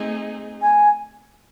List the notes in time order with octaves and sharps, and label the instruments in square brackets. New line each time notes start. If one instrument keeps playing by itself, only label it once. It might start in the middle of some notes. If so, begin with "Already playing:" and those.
Already playing: [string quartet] A3 C4 D#4 G#4
[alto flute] G#5